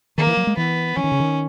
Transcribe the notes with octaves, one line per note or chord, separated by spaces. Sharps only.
D#3 A#3
E3
F#3
G#3
E3 B3
E3 C#4
D#3
C#3
D#3